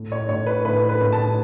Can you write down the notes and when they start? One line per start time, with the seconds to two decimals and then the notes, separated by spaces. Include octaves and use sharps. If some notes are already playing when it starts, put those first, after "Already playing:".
Already playing: A2
0.12 C#5
0.28 A2 C#5
0.46 B4
0.65 A2 B4
0.89 B4
1.02 A2
1.12 A5